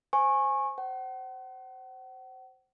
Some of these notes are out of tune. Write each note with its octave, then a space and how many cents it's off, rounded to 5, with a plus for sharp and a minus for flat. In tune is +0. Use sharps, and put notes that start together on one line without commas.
C5 +0 G#5 +0 C#6 -25
C5 +0 F#5 +40